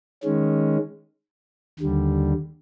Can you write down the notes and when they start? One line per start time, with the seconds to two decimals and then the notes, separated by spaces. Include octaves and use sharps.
0.23 D#3 G#3 C#4
1.79 D#2 D3 G3